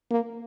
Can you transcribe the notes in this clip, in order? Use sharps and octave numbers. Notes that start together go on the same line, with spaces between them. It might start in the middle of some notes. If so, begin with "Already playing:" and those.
A#3